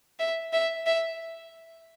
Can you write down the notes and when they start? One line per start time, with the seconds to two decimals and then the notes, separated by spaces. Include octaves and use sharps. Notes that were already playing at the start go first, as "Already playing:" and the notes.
0.19 E5
0.53 E5
0.86 E5